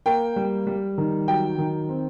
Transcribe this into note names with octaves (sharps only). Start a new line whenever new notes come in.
A#3 G5
G3
G3
D#3
F#3 G5
D#3
C4